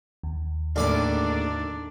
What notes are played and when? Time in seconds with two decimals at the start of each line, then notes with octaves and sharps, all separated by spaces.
0.23 D#2
0.76 D2 A2 D#3 A#3 D4 G#4 D5 B5